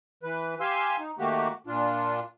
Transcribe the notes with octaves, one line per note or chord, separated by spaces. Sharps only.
E3 B4
G4 F5 G#5 C6 E6
D#4
D#3 A3 A#3 F#4 G4
A#2 D4 F4